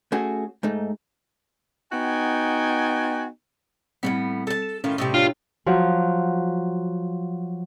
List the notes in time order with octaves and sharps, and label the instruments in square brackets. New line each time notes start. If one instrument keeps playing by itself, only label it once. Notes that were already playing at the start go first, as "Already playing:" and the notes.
[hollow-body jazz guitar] A3 C#4 F#4 G#4
G#2 A3 D#4
[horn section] B3 D#4 F#4 G5 G#5
[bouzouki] A2 C#3 B3 [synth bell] G3 C4 B6
[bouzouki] A4 A5
[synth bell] E7
[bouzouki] A2 D#3 F4 [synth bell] C#4
[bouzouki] A2 C3 G3 [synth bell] C#6 D#6 E6
[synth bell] D4 C#5 G5 [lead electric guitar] F4
[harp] F3 F#3